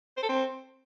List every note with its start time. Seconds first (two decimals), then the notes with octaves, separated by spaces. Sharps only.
0.17 C5
0.23 A4
0.29 C4